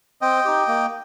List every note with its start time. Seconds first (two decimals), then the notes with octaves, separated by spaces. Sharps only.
0.21 C4 D#5 G5
0.45 D#4 G4
0.68 A#3